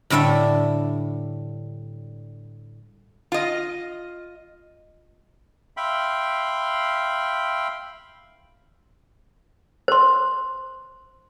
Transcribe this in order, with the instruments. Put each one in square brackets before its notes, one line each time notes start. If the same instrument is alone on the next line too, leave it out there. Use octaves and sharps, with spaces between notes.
[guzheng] A2 D3 G3 A4 E5
[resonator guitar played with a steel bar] F4 D#5
[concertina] E5 F5 G5 B5 C6
[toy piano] C5 C6